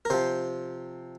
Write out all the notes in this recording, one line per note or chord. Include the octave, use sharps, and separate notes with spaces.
A#4
C3 F3 C5